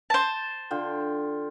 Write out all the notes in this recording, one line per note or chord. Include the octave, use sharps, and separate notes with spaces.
C5 A5
D3 F4 G5